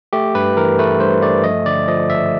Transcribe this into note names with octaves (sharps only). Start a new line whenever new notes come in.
A3 G4
G2 B4
E3 A#4
A3 B4
G2 C5
A3 D5
F3 D#5
D3 D5
F3 D#5
G#1 E5